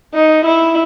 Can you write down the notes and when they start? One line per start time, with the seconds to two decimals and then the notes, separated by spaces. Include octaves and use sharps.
0.15 D#4
0.45 E4